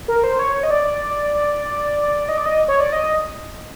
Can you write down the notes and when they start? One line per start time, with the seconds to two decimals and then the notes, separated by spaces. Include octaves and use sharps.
0.08 A#4
0.24 C5
0.39 C#5
0.63 D#5
0.71 D5
2.29 D#5
2.38 D5
2.46 D#5
2.68 C#5
2.80 D5
2.93 D#5